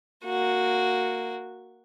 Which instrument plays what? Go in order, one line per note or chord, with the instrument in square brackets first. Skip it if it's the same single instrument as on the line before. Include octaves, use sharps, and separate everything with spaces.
[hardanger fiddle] A#3 F#4